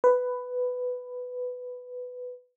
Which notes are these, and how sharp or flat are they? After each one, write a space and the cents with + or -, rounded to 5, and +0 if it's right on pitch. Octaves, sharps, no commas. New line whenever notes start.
B4 +10